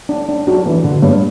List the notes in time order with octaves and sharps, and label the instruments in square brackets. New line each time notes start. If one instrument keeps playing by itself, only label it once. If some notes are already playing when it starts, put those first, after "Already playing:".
[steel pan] D4
D4
[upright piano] F#3 [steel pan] D4
[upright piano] E3 [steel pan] D4
[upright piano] D3 [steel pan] F#4
[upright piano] G2 [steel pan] C#5